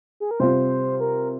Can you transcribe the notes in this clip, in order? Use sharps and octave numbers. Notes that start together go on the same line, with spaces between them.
G#4
A#4
C3 G3 C4 F4 C5
A#4